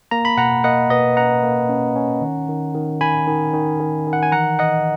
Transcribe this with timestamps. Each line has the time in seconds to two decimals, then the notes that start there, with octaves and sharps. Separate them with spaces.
0.11 A#3 A#5
0.25 B5
0.37 B2 F#5 A#5
0.64 A#3 D#5 F#5
0.90 B2 B4 D#5
1.17 C#4 F#5 A#5
1.43 A#3
1.69 C#4
1.96 C#4
2.22 D#3
2.48 D#3
2.74 D#3
3.01 D#3 G#5 B5
3.27 D#3
3.54 D#3
3.80 D#3
4.07 D#3
4.13 F#5
4.23 G#5
4.32 E3 F#5 A#5
4.59 E3 D#5 F#5